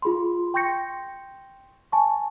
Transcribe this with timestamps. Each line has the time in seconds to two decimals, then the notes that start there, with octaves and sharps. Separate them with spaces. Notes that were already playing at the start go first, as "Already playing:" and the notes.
0.02 F4 G#4 B5 C6
0.54 G5 C6 C#6 G6 A#6 C#7
1.92 G#5 A5 C#6